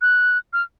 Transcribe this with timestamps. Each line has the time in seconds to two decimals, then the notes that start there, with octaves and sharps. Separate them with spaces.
0.01 F#6
0.53 F6